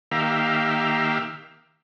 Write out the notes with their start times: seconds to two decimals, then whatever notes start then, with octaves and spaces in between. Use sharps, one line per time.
0.11 D#3 A#3 G4 E5 F5